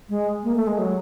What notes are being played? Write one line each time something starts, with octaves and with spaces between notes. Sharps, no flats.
G#3
A#3
A3
G#3
F#3